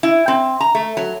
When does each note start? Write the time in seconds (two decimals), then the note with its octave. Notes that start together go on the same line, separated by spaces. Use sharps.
0.03 E4
0.28 C4
0.60 A#5
0.75 A3
0.97 F#3